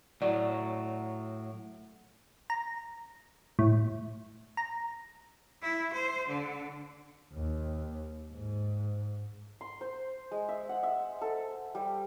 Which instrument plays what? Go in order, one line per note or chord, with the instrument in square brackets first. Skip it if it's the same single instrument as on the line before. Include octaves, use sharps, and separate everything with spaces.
[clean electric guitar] A2 F#3 [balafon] D5
[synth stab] A#5
A2
A#5
[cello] E4
C5
D3
[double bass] D#2
G#2
[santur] C6
C5
G#3
E5
F#5
E5
A4
G3